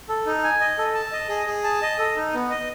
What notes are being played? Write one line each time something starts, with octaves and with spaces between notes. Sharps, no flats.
A4
D#4
G#5
D#5
A4
A5
D#5
G#4
G#4
A5
D#5
A4
D#4
B3
D#5